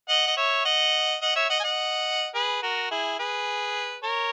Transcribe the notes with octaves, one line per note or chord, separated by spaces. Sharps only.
D#5 F#5
D#5
C#5 E5
D#5 F#5
D#5 F#5
C#5 E5
D#5 F#5
G#5
D#5 F#5
G#4 B4
F#4 A#4
E4 G#4
G#4 B4
A#4 C#5